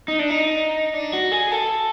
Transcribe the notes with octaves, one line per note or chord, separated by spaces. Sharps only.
D#4
D4
D#4
D4
F#4
G#4
A4